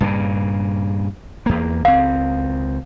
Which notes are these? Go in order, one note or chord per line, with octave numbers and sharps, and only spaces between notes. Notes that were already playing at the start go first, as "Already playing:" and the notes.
G2 A#2 C#3
E2 A#3
C#2 C4 F5